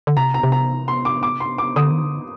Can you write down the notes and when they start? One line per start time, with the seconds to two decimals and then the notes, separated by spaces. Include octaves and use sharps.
0.07 D3
0.17 C3 A#5
0.34 A#5
0.43 C3
0.52 A#5
0.88 C6
1.05 D6
1.23 D6
1.40 C6
1.58 D6
1.76 D3 D#6
1.91 D#3
2.03 D3